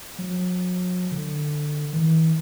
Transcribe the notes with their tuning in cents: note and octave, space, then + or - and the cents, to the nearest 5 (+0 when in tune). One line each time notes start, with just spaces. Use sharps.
F#3 -40
D3 +15
E3 -40